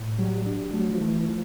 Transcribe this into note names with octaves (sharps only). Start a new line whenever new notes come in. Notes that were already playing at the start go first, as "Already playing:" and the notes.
Already playing: A2
F#3 G3
G3 D4
F#3 A3
F3
E3 A3
F3